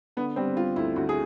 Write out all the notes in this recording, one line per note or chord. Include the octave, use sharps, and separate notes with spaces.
D3 B3
G3 C4
G3 F4
D2 E4
D2 F#4
G#4